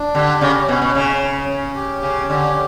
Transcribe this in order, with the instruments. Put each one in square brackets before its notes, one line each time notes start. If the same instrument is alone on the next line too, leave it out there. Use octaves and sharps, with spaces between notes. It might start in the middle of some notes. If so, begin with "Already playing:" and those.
Already playing: [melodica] D4
[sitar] D3 [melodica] G4
[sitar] C#3 [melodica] C#4
[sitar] B2 [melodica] C#4
[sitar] B2
[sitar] C#3 [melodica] C#4
[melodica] C#4
C#4
G4
[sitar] C#3 [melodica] C#4
[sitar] D3 [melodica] G4